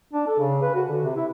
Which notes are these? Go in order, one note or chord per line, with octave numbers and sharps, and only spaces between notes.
D4
A4
C#3
B4
F#4
D3
C3
E4